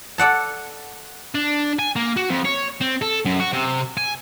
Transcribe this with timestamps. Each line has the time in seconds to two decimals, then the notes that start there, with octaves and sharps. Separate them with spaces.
0.18 A4 D5 F#5 A5
1.35 D4
1.79 G#5
1.96 A#3
2.17 F#4
2.29 F2
2.45 C#5
2.81 C4
3.02 A4
3.25 F#2
3.40 F#4
3.53 C3
3.97 G#5